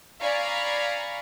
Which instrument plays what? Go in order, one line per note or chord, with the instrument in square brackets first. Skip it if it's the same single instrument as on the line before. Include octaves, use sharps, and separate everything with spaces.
[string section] D5 F5 G#5 A#5 B5 C#6